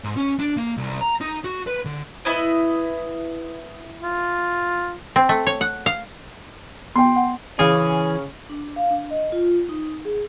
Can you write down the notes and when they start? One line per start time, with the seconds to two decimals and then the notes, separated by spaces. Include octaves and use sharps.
0.04 G#2
0.17 C#4
0.39 D4
0.57 A#3
0.77 C2
1.01 A#5
1.21 D#4
1.44 F#4
1.67 B4
1.85 D3
2.25 B3 E4 D#5
4.03 F4
5.16 C4
5.29 A3
5.47 C#5
5.61 F#5
5.86 F5
6.96 B3 G5 C6
7.16 F#5
7.59 C#3 E3 C#4 G#4 F5
8.49 D4
8.76 F5
8.90 D4
9.11 D#5
9.32 F4
9.69 D#4
10.05 G#4